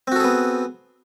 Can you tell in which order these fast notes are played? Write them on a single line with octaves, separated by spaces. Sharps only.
C4 F#4 A4 G#4 B3